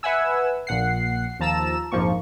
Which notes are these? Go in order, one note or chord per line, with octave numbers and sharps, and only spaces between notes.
B4 E5 F#5 G#5 E6
A#1 A#2 F#5 C7
D#2 F3 A5 A#5 E6 E7
A#1 F2 G#2 F3 A#3 C#6